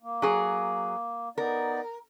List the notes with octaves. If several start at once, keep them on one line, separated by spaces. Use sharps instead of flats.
A#3
F#3 G#4
B3 D#4 A#4 D5